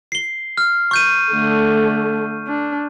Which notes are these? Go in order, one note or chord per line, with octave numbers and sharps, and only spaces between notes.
C7 G7
F6
C#6 G6 D#7
D3 A3
D4